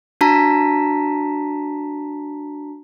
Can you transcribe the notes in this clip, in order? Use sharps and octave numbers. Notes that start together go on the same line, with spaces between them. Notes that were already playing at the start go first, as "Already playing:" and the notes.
D4 F#4 A5 A#5 B6